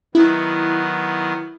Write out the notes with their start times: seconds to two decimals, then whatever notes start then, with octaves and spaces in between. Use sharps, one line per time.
0.15 D#3 F#3 B3 E4